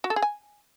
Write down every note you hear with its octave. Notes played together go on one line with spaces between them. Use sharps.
F#4
A4
G#4
G#5